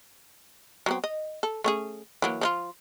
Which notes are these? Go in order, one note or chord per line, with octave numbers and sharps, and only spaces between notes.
F#3 B3 C4
D#5
A4
A3 C#4 G#4
E3 F#3 A#3
F3 D#4 F4